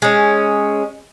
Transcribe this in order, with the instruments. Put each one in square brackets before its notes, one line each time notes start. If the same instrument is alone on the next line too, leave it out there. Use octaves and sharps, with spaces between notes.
[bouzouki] G#3 C#4